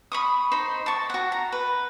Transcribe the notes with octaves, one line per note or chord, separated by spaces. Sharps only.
B5 C#6 D#6
D#4 C5 B5
A5 C#6
F#4 F#5
A#5
B4